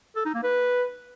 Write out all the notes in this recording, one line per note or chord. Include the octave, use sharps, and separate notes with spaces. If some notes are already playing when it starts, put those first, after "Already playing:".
A4
D#4
A#3
B4